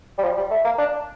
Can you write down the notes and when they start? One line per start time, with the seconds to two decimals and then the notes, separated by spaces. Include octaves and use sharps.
0.18 G3
0.23 F3
0.37 G3
0.51 A3
0.65 A#3
0.78 D4